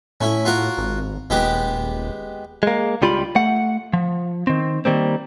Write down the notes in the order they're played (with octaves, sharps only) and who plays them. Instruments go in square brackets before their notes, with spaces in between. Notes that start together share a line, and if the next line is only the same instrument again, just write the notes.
[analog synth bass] A2 [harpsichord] C#4 E4
[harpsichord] F4 F#4 A#4
[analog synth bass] G#1
[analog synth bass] D#1 [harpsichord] G#3 B3 G4
[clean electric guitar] G#3 A#3
C#2 G3 F4 G4 B5
A3 F#5
F3
D#3 C4
D#3 G3 A#3 C4